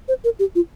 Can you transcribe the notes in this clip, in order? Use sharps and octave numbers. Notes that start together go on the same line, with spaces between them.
C5
A#4
G4
F4